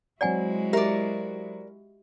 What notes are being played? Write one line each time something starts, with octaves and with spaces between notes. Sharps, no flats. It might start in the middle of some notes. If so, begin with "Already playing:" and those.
F#3 G#3 C4 E4 F#4 D5 F#5 G#5
G4 A#4 D5 E5